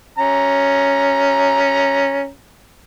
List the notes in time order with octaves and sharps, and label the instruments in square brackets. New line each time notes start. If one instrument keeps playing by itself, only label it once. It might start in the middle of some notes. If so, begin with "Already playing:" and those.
[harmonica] C#4 A#5